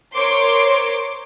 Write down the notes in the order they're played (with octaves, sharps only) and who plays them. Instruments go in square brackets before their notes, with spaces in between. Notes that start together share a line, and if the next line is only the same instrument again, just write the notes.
[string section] A#4 C5 C#5 C6 D6